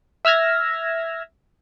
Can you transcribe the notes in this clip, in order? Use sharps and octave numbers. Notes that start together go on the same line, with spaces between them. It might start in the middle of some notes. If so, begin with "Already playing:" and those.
E5 E6 F6 G#6 A#6